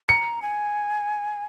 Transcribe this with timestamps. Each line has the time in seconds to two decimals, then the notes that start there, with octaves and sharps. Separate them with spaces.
0.09 A#5 C#7
0.42 G#5